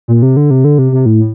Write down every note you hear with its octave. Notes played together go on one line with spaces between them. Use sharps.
A#2
C3
D3
C3
D3
C3
C3
A2